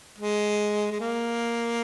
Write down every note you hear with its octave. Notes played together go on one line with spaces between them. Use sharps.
G#3
G#3
A#3